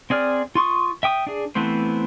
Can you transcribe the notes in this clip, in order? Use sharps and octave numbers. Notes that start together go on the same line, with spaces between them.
C4 G#4 D5 F6
F4 C6 C#6 D#6
E5 G5 D#6
D4 G#4
E3 A3 B3 C4 C5